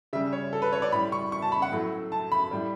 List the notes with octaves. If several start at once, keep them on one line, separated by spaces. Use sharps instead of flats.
C#3 G3 E5
C#5
A4
B4
C#5
D5
A2 G3 B5
C#6
C#6
A5
B5
F#5
A2 F#3 A3
A5
B5
A2 G3